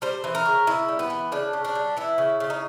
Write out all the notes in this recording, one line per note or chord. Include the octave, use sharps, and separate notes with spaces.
G3 C5
E3
A#4
C#3
C#3 E4
G3
B3
E3
C#3 D4
C#3
D4
G3
E3 E4
C#3
C#3
D#4